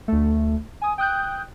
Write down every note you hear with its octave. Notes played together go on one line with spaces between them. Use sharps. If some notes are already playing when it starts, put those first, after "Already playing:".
D2 A3
G#5 D#6
G5 D#6 F#6 G6